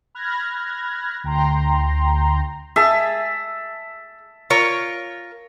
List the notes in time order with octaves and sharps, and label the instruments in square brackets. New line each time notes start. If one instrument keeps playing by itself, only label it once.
[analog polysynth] B5 F6 F#6 G#6 A#6
D2 G5 A#5 C6
[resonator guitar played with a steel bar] G#4 [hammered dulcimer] E5 A5
[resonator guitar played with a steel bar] F4 A#4 C#5